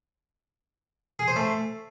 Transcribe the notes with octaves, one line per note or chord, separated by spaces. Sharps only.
G#4
C5
A3